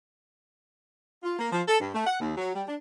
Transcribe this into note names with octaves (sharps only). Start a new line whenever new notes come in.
F4
A#3
F3
A4
G2
A3
F#5
D#2
F#3
G3
D4